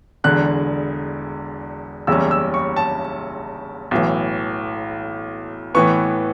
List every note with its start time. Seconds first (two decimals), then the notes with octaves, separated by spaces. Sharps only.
0.24 E1 E2 D3 F#6
2.07 F#1 E2 C#3 G3 C#4 E6
2.31 E6
2.54 C#6
2.76 A5
3.91 B1 A2 E3
5.74 A2 E3 B3 C#6